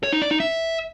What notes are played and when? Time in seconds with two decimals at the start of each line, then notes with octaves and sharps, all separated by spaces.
0.03 C#5
0.13 D#4
0.22 D5
0.31 D#4
0.40 E5